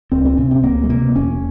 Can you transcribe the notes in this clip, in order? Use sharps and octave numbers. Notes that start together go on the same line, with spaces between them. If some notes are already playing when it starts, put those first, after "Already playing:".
C#2 C4
C4
C3 C#4
C4
C#2 A#3
G#3
C3 A#3
E1 C#4